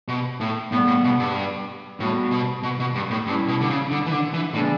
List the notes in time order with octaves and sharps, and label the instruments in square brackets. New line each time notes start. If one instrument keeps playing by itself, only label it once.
[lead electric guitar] B2
A2
[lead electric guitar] A2 [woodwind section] C#3 G3 B3
[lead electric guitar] A2
B2
G2
[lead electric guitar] A2 [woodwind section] G3 B3 F#4
[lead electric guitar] B2
B2
B2
G2
A2
[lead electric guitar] G2 [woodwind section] G3 C#4 E4
[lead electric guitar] B2
D3
C#3
D3
E3
D3
E3
[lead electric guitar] A2 [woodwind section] C#3 E3 G3 B3 D4